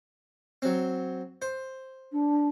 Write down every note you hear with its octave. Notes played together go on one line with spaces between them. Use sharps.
F#3 C4
C5
D4